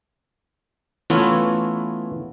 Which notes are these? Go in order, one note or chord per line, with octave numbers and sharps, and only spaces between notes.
E3 A3 B3 C#4 E4 F4